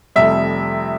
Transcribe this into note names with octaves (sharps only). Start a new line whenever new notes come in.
F1 F2 C3 G3 E5